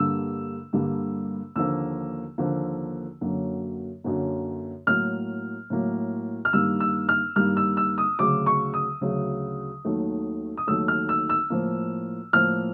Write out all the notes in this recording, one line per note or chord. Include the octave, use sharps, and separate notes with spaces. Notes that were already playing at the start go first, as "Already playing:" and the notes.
Already playing: G2 D3 G3 A#3 E6
G2 D3 G3 A#3
D#2 D3 F3 A#3 E6
D#2 D3 F3 A#3
F#2 D3 F#3 A#3
F#2 D3 F#3 A#3
A2 F#3 A#3 F6
A2 F#3 A#3
F6
G2 D#3 G3 A#3 E6
E6
F6
G2 D#3 G3 A#3 F6
E6
E6
D#6
D2 C#3 F#3 D6
C#6
D#6
D2 C#3 F#3
D#2 D#3 F#3 A3
D#6
D#2 D#3 F#3 A3 E6
F6
E6
E6
A2 F3 A#3
A2 F3 A#3 F6